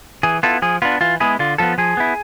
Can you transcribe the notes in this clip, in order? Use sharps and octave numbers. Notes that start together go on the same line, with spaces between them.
E3 G#4
B3 E4 F4 A4
F3 G#4
B3 D4 F4
E3 F4
G#3 B3 E4 G#4
D3 F4
F3 B3 F4 A4
F3 G#4
B3 E4